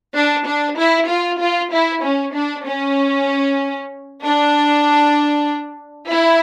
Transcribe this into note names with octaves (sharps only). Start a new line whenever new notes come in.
D4
D4
E4
F4
F4
E4
C#4
D4
C#4
D4
E4